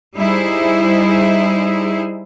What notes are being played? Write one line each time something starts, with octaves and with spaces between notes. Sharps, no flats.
G3 D#4 E4 G#4 C5